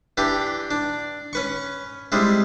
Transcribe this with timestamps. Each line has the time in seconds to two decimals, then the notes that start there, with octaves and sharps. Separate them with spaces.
0.17 E3 D4 G4
0.71 D4
1.33 C#4 B4 C#6
2.12 C3 G3 G#3 E4